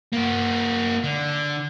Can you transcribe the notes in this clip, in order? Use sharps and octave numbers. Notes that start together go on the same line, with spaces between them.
A#3 F#4
D3